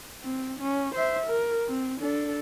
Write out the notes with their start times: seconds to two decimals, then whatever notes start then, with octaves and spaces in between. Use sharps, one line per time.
0.23 C4
0.60 C#4
0.95 C5 E5
1.26 A#4
1.68 C4
2.00 D4 A4